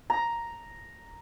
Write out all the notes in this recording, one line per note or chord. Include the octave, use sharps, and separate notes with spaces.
A#5